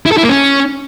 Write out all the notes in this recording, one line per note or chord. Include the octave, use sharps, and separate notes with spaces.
E4
A4
E4
A#3
C#4